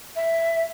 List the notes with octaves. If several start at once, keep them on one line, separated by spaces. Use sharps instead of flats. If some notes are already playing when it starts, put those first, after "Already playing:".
E5